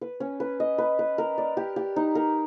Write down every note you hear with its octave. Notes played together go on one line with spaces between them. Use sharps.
B4
C#4
B4
D#5
B4
B4
A#4
D5
G4
G4
D#4
A#4